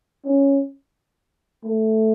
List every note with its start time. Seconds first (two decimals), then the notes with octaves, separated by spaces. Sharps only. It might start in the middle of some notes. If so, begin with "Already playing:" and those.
0.25 C#4
1.64 A3